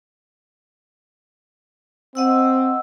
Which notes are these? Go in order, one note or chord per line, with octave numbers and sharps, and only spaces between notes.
C4 D#5 F#5 E6